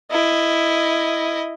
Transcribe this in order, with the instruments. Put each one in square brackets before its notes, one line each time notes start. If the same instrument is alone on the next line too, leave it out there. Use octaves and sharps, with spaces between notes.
[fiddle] E4 D#5